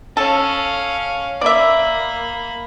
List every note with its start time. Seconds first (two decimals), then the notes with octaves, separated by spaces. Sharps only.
0.17 C#4 A4 F5
1.41 A#3 D5 E5 B5